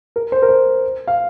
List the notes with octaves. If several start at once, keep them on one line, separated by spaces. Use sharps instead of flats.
A#4
C5
A#4
C5
F5